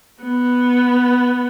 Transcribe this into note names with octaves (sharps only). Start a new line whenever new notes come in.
B3